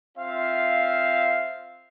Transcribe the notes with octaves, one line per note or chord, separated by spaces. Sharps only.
C4 F4 E5 F5